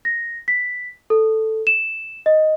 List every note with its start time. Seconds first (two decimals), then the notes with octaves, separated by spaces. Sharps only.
0.05 A#6
0.48 B6
1.10 A4
1.67 E7
2.26 D#5